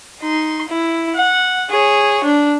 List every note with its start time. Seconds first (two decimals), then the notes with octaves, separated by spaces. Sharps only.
0.21 D#4 C6
0.68 E4
1.16 F#5
1.70 G#4 C#5
2.24 D4